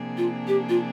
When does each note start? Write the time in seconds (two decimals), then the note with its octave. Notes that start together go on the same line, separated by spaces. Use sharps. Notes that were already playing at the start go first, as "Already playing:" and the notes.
Already playing: C3 F3 A#3 D4 G#4
0.17 F4
0.48 G4
0.69 F4